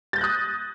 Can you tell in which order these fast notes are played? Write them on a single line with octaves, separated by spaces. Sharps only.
A6 G6 A#6 F#6 D#6